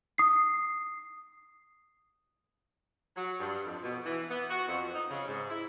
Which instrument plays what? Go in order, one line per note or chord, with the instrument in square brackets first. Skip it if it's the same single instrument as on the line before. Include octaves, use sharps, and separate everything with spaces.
[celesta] D#6 C7
[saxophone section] F#3
G2
F2
B2
E3
B3
F#4
F2
D#4
C#3
G#2
E4